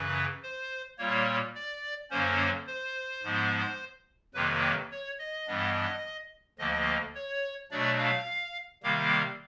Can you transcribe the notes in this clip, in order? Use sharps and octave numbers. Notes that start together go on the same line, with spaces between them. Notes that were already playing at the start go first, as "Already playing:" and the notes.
Already playing: F#2 C#3 E3 B4
C5
A#2 G3 A#3 C#5
D5
F#2 D3 F#3 A#3 C#4 C5
C5
G#2 F3 G#3 B3
F2 C3 D#3 F#3 A#3 B4
C#5
D#5
G2 E3 G3 B3 D4
D2 D3 F3 A#3 D#5
C#5
B2 F#3 A3 D4 D5
F5
C3 D#3 G3 A#3 F5